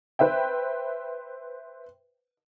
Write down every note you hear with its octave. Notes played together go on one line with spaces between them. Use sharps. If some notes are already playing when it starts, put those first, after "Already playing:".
B4 C5 E5 G5